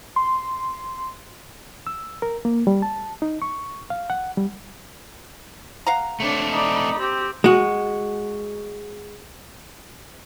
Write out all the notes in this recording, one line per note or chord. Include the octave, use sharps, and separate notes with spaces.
C6
E6
A#4
A#3
G3
A5
D#4
C#6
F5
F#5
G3
F5 F#5 A#5
A3 C4 D4 C#5
D#4 D5 B5
C4 G4
G#3 F#4